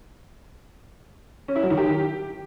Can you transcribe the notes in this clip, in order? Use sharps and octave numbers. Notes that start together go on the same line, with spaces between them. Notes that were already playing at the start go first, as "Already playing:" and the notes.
C#4
E4
F#3
D#3
G4